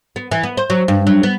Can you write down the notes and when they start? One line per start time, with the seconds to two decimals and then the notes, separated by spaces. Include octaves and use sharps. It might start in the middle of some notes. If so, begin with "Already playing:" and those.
0.16 B3
0.31 E3
0.43 B3
0.57 C5
0.70 F#3
0.88 G2
1.07 F#3
1.23 B3